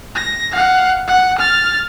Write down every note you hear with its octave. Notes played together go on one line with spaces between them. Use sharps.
A#6
F5 F#5
F#5
F6 A6